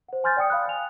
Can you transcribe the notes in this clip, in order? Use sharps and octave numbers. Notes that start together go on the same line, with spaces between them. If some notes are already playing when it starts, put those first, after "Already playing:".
C5 F#5
G#5 C6 F6 G6 A6
D5 G5 D#6 C#7
F5 B5 D#6 F#6
F5 G#5 F7